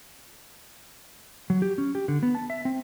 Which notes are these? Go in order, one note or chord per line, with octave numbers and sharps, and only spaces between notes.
F#3
G4
C#4
G4
D3
B3
A5
E5
C4